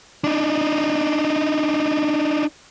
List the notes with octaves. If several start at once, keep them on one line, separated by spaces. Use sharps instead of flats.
D4 D#4